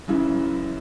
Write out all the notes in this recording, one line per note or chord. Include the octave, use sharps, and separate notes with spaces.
F#2 C#3 E3 E4